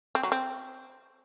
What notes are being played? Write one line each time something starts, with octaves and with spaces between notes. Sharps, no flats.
C4
F#3
C4